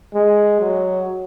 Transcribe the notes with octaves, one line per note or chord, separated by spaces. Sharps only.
G#3
F#3